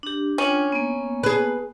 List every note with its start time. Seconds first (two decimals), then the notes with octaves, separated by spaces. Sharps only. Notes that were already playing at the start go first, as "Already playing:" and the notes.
0.03 D4 G4
0.38 C#4 D4 F4 G5
0.72 A#3 B3
1.23 G#4 B4